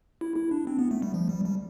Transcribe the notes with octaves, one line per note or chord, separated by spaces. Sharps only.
E4
E4
D4
C4
B3
A3
G3
F3
G3
G3